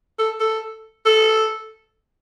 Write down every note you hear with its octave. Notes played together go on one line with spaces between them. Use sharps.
A4
A4
A4